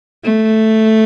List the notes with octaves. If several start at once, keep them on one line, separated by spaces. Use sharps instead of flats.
A3